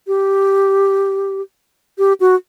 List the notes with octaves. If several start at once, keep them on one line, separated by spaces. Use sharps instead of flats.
G4
G4
F#4